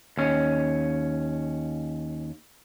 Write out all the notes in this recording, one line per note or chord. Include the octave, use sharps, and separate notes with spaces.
D#2 C#4